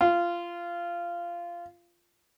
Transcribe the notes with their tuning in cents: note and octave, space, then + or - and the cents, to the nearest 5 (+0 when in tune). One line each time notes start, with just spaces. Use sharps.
F4 -15